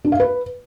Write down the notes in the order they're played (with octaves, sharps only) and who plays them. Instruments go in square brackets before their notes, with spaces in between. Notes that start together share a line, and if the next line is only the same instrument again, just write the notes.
[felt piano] D4
F5
B4